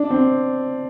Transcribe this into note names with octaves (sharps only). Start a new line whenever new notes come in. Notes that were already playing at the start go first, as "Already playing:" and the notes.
Already playing: D4
C4